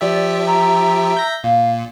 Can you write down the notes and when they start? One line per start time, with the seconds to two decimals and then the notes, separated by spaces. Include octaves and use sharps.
0.01 F3 G4 D5 E5
0.47 A#5
1.15 E5 G6 A#6
1.44 A#2 F5